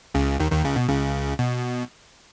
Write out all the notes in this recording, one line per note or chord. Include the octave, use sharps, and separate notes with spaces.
C#2 C#3
D#2 D#3
D#2 D#3
C#2 C#3
B2
C#2 C#3
B2